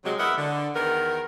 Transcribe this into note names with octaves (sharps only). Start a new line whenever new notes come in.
C3 F#3 G#3
E2 E4 A#4 D#5 E5 F#5
D3
E2 D#3 B3 A#4